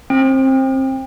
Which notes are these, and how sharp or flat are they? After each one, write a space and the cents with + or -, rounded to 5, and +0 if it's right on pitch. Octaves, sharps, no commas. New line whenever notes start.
C4 +25